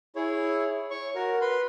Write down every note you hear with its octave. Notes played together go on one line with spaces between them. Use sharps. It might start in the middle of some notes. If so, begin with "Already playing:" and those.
E4 G#4 C#5
C#5 C#6
F#4 A#4
B4 B5 C6